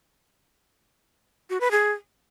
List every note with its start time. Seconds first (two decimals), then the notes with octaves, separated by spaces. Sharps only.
1.50 F#4
1.61 B4
1.71 G#4